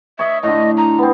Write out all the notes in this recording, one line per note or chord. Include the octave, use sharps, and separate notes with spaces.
C#5 D#5 E5
A2 D3 D#5
A#5
B3 C4